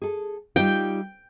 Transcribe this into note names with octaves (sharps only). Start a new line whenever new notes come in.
G#4 A4
G3 D#4 F4 G5